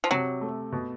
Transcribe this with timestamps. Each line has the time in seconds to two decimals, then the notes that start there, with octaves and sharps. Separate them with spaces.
0.04 F3
0.11 C3 F#3
0.41 A3
0.72 B2